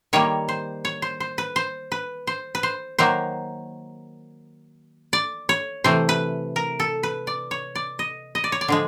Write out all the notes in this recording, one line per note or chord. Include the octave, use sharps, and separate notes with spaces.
D#3 G3 A#3 C#5
C5
C#5
C5
C5
B4
C5
B4
C5
B4
C5
D#3 F#3 A#3 C5
D5
C#5
C3 E3 A3 C5
B4
A#4
A4
B4
D5
C#5
D5
D#5
D#5
D5
C#5
D5
D3 F3 G#3